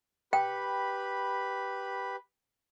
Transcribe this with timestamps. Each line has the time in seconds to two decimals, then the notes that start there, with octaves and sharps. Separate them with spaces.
0.33 G4 B4 G5 B5